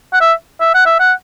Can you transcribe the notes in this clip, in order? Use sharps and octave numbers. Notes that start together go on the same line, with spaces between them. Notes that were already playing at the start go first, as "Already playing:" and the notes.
F#5
E5
E5
F#5
E5
F#5